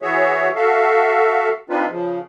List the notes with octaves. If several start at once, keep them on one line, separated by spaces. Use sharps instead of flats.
E3 F#4 G#4 C#5 E5
F#4 A4 E5 F5
C4 D4 D#4 F4 B4
C#3 F3